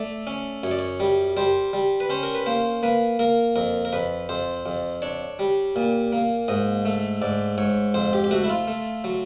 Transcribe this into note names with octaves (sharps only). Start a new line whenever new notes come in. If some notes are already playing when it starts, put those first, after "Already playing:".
Already playing: A3 D5
C#4
F#2 C#5
D5
C#5
G3
G3 C5
G3
B4
C#4 C5
A#4
B4
A#3 C5
A#3 B4
A#3 A#4
F2 A#4
A#4
F2 B4
F2 C5
F2
D4 C#5
G3
A#2
A#3
G#2 D#5
A3
G#2 D5
G#2 C#5
F2 C5
G4
G4
A3 F#4
E4
F4
A3
F#3